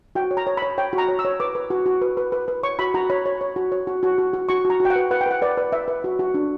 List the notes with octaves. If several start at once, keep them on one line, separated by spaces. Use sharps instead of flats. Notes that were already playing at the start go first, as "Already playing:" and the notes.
F#4 G5
C#5
A#5
C#5
C#5 B5
C#5 G5
F#4
A#5
C#5
E6
C#5
B4 D6
B4
F#4
F#4
B4
B4
B4
B4
C#5 C#6
F#4 B5
F#4 A#5
C#5 B5
C#5
C#5
F#4
C#5
F#4
F#4
F#4
F#4
F#4 C#6
F#4
A#5
F#4
G5
F#5
B4
B4 F#5
G5
B4 F#5
B4 D5
B4
B4 E5
B4
F#4
F#4
D4